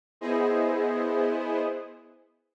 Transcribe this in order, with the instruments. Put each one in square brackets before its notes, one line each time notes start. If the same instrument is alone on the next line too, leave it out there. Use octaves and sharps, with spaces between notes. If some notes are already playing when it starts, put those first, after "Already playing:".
[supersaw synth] B3 E4 G#4 C5 D#5